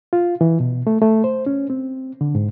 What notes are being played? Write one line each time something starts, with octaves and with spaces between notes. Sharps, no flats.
F4
E3
B2
A3
A3
C5
C#4
C4
D3
G#2